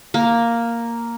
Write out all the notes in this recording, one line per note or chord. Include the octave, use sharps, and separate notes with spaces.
A#3